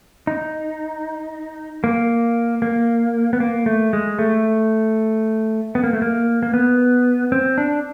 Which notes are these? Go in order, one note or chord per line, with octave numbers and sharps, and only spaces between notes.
D#4
A#3
A#3
B3
A#3
A3
G#3
A3
B3
A#3
A3
A#3
A#3
B3
C4
D4